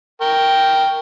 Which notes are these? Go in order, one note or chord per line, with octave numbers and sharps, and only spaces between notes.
A#4 G5 C#6